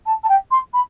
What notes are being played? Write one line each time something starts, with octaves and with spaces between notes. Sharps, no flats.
A5
A5
G5
C6
B5